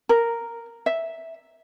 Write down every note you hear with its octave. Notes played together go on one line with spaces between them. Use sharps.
A#4
E5